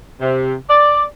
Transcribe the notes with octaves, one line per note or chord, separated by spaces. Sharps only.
C3
D5